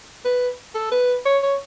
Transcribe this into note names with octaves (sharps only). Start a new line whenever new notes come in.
B4
A4
B4
C#5
C#5